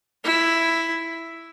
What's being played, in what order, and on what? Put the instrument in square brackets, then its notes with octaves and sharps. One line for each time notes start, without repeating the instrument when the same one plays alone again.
[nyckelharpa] E4